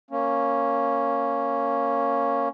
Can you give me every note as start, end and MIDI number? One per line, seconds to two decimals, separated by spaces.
0.11 2.49 58
0.11 2.49 61